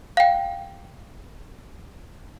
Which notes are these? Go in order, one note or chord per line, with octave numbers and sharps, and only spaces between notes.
F5 G5